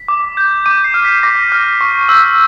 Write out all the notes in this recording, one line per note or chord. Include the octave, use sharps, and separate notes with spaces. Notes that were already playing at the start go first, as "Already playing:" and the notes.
Already playing: B6
D6
G6
D6 D#7
C7
F6
B6
D6 A#6
F6
C#6
E6 G6